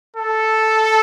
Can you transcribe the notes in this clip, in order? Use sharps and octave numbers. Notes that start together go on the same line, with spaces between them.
A4